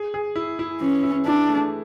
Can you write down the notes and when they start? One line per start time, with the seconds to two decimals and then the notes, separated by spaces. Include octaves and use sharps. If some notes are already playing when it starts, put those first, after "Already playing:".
Already playing: G#4
0.14 G#4
0.36 E4
0.59 E4
0.81 E3 C#4
1.03 E4
1.26 D4 E4
1.49 A3